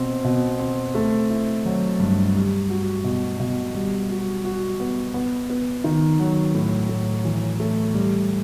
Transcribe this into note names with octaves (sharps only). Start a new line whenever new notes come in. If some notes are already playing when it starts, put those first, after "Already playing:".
Already playing: B2 C4
B2
C4
A3
E4
F#3
G2
G3
F#4
B2
B2
G3
F#4
F#4
B3
B3
B3
D#3
F#3
A2
A2
E3
A3
G3